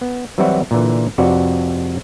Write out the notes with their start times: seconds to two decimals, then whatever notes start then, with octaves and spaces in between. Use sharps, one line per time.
0.01 B3
0.38 E3 F#3 G3 C4 E4 F#4
0.71 A#2 D3 E3
1.18 F2 C3 F#4 B4 D5